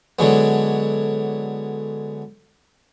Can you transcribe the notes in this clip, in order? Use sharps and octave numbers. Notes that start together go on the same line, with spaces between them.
D3 F#3 G#3 B3